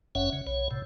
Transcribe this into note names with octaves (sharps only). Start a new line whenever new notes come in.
G1 F#2 C#4 C#5 E5 F#5
C#3
B1 C#5
A2 C3